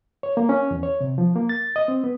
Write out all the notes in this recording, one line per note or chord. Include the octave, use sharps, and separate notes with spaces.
C#5
A#3
C#4
E2
C#5
C3
F3
A#3
A6
D#5
C4
B3